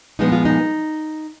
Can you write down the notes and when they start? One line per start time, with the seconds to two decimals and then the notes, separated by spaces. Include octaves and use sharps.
0.19 A#2 F3 G#3 B3 D#4
0.32 F4
0.45 D#4